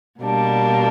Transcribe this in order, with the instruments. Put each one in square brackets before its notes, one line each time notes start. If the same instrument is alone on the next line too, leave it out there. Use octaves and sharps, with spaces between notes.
[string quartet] B2 G3 A#3 D4